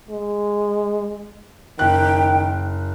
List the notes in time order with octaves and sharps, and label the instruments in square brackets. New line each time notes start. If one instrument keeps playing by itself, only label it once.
[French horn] G#3
[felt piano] F#1 F#6 [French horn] D#3 [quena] G5